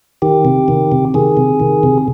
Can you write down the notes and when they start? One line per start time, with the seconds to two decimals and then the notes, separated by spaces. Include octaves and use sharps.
0.22 D#3 G4
0.45 C3
0.68 D#3
0.92 C3
1.14 D#3 G#4
1.37 C3
1.60 D#3
1.83 C3